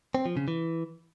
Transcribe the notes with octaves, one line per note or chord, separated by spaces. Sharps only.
C4
F3
C#3
E3